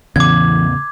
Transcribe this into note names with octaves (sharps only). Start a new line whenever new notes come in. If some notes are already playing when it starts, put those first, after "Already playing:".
E2 A2 C#3 E3 B3 D6 G#6